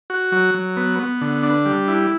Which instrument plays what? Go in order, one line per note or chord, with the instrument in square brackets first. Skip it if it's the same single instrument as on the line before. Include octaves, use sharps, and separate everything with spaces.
[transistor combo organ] F#4
F#3
F#3
B3
B3
D3
D4
G3
E4